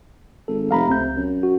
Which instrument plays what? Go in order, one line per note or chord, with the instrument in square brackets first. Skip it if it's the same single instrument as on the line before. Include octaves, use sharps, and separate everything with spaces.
[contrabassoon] G#1 [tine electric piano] A4
[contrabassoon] F1 [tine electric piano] F5 A#5 B5
[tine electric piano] C#2 G6 [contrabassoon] C3
[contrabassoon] F#2
[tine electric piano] F#4